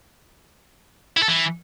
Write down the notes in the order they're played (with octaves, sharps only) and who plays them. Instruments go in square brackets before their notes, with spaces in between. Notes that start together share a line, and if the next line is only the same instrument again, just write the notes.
[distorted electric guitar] E4
A4
E3